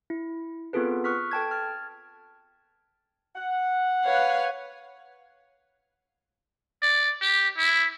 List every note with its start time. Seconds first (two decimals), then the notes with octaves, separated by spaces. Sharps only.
0.10 E4
0.73 B3 C4 F4 G#4 A4 B4
1.04 C#6 D#6 F6 F#6 B6
1.31 A4 G5 A5 G#6
1.51 F6 G#6 A6
3.35 F#5
4.04 B4 C#5 F5
6.82 D5
7.21 G4
7.58 E4